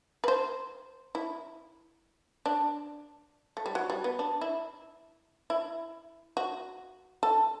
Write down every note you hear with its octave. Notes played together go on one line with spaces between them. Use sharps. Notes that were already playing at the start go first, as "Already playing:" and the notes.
B4
C5
E4
D4
A3
G3
F#3
G3
B3
D4
E4
E4
F#4
A4